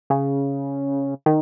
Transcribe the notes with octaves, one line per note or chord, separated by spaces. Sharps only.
C#3
D#3